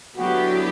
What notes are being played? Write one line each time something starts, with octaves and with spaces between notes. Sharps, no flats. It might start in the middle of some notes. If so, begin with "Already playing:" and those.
D3 F#3 B3 E4 F#4 G4